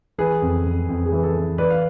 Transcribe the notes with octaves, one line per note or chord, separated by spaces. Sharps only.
E3 G#4 B4
F2
F2
F2
G#4
E3
A4
E3
E3 B4 D5
F5